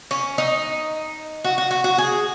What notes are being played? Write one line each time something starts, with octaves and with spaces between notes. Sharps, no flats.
C#4
D#4
F#4
F#4
F#4
F#4
G#4